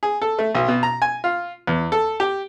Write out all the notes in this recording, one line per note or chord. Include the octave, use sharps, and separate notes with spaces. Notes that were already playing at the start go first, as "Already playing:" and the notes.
G#4
A4
A3
B1
B2
A#5
G#5
F4
E2
A4
G4